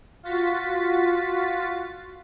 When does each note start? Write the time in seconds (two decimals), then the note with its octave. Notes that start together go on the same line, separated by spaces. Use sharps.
0.23 F4 F#4 A6 B6